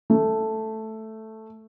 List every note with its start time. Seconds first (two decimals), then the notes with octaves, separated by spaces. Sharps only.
0.10 A3